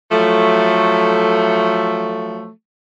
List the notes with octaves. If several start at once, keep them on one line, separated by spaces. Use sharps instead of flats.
F3 F#3 A3